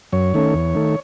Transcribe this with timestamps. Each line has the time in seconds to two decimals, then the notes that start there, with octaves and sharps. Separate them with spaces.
0.12 F#2 C#5
0.34 D#3 A3 C#4
0.54 E2
0.75 D#3 A3